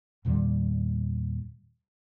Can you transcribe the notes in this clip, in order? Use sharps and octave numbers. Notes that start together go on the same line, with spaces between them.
E2 A#2 D#3 G3